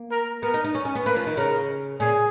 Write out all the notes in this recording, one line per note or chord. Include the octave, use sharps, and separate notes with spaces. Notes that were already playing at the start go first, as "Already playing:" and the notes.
Already playing: A#3
A#4
B3 A#4
D#4
D#4
C#4
C#4
B3
A#3 B4
F3
D#3
C#3 A#4
A#2 G#4